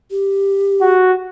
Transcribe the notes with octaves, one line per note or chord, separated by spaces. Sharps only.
G4
F#4